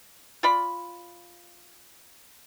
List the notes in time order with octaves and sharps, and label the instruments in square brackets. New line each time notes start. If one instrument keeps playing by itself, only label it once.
[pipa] F4 D5 B5